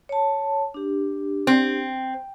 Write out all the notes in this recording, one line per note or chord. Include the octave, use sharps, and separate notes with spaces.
C#5 A5
D4 G4
C4